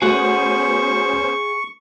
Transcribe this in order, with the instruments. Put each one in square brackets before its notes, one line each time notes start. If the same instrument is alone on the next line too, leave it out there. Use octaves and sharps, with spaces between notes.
[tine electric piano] A3 F#4 [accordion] B3 C#4 C5 [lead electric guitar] G#4 F#5 [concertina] C#6